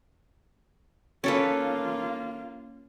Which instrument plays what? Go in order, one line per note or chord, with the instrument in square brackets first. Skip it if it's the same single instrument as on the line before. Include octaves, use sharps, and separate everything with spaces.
[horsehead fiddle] A#3 F4 [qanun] C#4 A4 B4